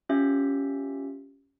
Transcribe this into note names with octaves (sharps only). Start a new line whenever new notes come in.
C#4 F4 G4 E5